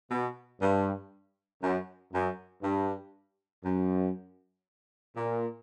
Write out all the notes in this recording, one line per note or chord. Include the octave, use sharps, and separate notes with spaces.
B2
G2
F#2
F#2
G2
F#2
A#2